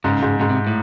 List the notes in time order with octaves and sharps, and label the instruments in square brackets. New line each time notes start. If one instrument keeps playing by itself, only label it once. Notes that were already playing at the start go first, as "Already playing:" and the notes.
[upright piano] G#2 [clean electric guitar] C#3
[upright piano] G#2
[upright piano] G#2 [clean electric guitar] C#3
[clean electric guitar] C3
A2